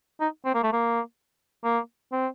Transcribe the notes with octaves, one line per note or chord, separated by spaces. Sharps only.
D#4
C4
A#3
A3
A#3
A#3
C4